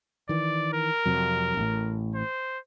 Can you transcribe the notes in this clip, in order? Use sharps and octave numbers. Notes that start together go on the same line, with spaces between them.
D#3 E3 D5
A#4
F2 C3 F#3
A1 A2
C5